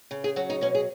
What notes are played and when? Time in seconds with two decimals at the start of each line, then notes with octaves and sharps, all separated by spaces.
0.11 C#3
0.24 G#4
0.36 F#3 F#4
0.50 D#4
0.61 B2 C#4
0.75 G#4